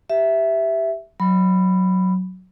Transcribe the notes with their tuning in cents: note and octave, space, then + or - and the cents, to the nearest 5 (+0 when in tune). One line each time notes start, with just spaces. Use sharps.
G4 +0 E5 +0
F#3 +0 B5 +5